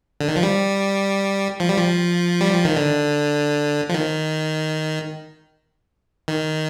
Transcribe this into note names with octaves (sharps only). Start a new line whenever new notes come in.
D3
D#3
F3
G3
F3
G3
F3
G3
F3
D#3
D3
F3
D#3
D#3